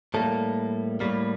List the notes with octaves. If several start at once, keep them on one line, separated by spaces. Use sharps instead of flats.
A2 G3 A#3 A4
A2 G3 A#3